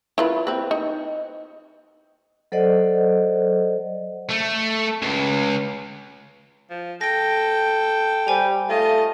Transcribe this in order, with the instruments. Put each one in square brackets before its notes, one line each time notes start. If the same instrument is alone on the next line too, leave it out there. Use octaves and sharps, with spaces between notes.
[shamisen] E4 F4 B4
C4 B4
D#4
[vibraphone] F#3 A4 C5 D5 D#5 F#5
[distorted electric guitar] A3
C#2
[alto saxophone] F3
[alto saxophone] A4 [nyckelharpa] G5 [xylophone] A#6 D7
[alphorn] G3 [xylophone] C5 G#5 F7
[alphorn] A3 [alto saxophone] F4 [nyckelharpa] D#5